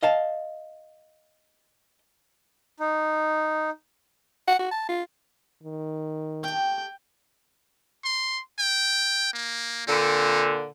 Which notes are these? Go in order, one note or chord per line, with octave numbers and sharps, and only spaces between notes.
D#5 F5 A5
D#4
F#5
F#4
A5
F4
D#3
A3 G4 G5
C6
G5
A#3
A#2 D3 C4